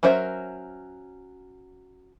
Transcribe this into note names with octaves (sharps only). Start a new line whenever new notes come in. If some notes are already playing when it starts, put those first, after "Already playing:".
F#3 C#4 A#4 C5 E5